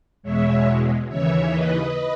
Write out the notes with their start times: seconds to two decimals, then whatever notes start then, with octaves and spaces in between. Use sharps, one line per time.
0.23 E2 B2 G#3 C#5 E5
1.09 D#2 C#3 E3 C#5 E5
1.51 B4 D#5